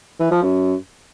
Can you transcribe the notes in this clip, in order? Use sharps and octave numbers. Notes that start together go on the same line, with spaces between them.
E3
F3
F#2